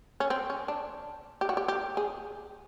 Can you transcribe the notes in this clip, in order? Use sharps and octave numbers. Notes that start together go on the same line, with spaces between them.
C#4
C4
C#4
D4
G4
F#4
G4
G4
G#4